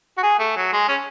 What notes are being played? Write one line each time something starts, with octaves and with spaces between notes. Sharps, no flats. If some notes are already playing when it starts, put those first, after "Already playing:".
F#4
G#4
A3
F#3
G#3
C#4